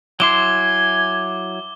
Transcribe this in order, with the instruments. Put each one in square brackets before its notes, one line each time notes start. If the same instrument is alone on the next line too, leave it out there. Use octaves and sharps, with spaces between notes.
[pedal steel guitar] F#3 E4 C6 [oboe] G#5 [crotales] D6 G7